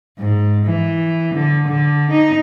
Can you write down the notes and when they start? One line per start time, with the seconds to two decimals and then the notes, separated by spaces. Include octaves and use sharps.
0.19 G#2
0.66 E3
1.35 D3
1.67 D3
2.11 D#4